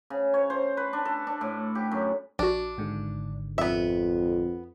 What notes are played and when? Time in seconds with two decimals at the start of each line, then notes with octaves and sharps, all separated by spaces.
0.10 C#3
0.34 C#5
0.50 C5
0.77 B4
0.93 D4
1.05 A4
1.27 D4
1.41 A2
1.75 G4
1.92 F#2
2.39 A#1 D4 F#4
2.78 G#1 G#2 D3
3.58 F2 B3 E5